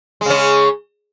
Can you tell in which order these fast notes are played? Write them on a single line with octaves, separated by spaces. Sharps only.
G#3 C#3 C#4